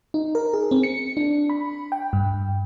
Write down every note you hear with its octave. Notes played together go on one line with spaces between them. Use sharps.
D#4
A#4
G#4
C4
C#7
D4
B5
G5
G2